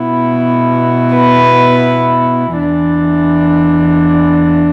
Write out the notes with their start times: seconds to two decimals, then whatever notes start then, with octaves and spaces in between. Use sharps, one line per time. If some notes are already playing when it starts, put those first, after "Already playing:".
Already playing: B2 B3 E4
1.14 B4
2.54 E2 E3 D4